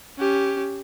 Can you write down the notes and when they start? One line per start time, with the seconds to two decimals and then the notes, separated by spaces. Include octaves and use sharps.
0.19 C#4 G4